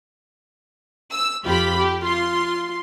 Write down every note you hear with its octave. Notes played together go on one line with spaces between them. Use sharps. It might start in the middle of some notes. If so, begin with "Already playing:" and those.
E6
F2 F4 G4 B5
G4
F4 C6